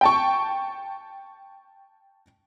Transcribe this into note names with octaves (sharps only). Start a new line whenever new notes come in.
G5 A5 C#6